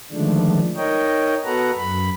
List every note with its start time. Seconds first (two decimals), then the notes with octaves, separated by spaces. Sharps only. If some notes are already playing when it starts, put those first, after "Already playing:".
0.12 D3 D#3 F3 G#3 A3 D4
0.77 D#4 A#4 C#5 D#5 G5
1.45 B3 F#4 A4 B4 F#5 A#5
1.77 F#2 B5